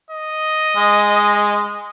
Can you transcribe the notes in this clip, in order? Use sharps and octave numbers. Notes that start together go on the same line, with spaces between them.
D#5
G#3